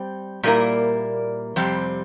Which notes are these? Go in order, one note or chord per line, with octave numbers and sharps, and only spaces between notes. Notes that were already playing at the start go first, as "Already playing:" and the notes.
Already playing: G3 C4
A#2 G3 A#3 E4 A#4
F2 C3 G3 C4